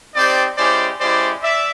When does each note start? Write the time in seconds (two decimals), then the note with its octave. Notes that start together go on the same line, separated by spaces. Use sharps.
0.15 C4 D#4 G4 C5 D5
0.58 G#3 C#4 E4 G4 C5 D5
1.00 G#3 C#4 E4 G4 C5 D5
1.43 D5 E5